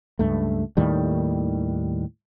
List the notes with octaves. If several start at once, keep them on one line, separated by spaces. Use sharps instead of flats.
C#2 G2 A3
D#2 A2 D#3 G3